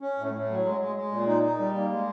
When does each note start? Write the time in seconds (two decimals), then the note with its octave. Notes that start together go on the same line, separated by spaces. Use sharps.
0.01 C#4
0.18 A2
0.34 A2
0.50 F#3
0.65 G#3
0.81 G#3
0.96 G#3
1.11 A#2
1.27 D#4
1.43 D#4
1.59 G3
1.74 A#3
1.91 G#3